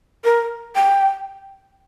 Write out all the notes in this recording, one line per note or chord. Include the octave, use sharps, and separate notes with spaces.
A#4
G5